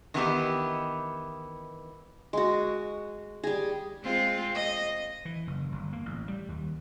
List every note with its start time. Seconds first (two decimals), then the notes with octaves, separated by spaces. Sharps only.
0.14 D#3 E3 B3 D#4 E4 G4
2.33 G#3 F#4
3.44 G3 G#4
4.03 G#3 C4 F4
4.55 D#5
5.25 E3
5.47 F#1
5.72 G1
5.92 A#3
6.05 A1
6.28 G3
6.48 D#2